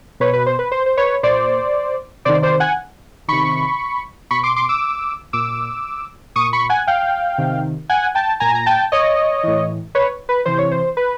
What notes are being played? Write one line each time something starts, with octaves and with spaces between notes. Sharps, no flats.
B2 B4 C#5
B4
C5
B4
C5
C5
B4 C#5
A#2 C5 D5
C3 D#3 C5 D5
C5 D5
F#5 G#5
C3 D#3 B5 C#6
B2 B5 C#6
C6 D6
C6 D6
D6 E6
A#2 D6 E6
A#2 C#6 D#6
B5 C#6
F#5 G#5
F5 G5
C3 D#3
F#5 G#5
G5 A5
A#2 G#5 A#5
A#5
G5 A5
C#5 D#5
A2 E3
B4 C#5
B4
C3 E3 C5
C#5
C5
B4